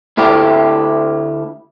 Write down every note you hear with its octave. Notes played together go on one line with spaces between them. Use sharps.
D2 A3 E4 G4